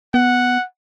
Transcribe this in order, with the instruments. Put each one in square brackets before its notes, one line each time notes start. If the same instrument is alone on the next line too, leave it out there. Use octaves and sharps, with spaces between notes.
[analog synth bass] B3 [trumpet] F#5